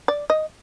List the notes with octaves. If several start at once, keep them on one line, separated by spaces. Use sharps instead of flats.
D5
D#5